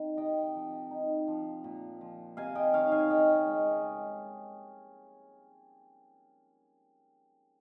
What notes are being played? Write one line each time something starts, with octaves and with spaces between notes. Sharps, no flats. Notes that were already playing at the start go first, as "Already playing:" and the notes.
Already playing: D#3 C4
C3 D#5 G5
F3
D#4
F3
A#2
F3
C3 F5 G#5
D#5 G5
D#3 C#5 F5
F5 G#5
C#3 D#5 G5
G#3